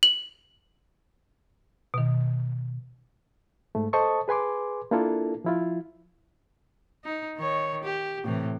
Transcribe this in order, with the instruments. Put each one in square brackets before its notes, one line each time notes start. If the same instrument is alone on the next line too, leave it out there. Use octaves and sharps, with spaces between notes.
[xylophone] F#7
[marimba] B2 D#3
[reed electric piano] G#2 A3
A4 C5 D#5 A5 C#6 D#6
G#4 B4 G#5 C6 D6
A#3 D4 E4 F4 A4 A#4
F3 E4 F4
[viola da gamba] D#4
D#3 C#5
G4
A2 C3 E3